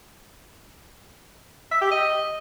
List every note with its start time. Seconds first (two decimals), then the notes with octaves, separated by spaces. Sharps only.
1.72 E5
1.82 G4
1.91 D#5